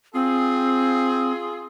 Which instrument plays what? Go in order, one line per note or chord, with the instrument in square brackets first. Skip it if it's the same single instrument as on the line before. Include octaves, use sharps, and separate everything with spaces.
[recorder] C4 [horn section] F4 G#4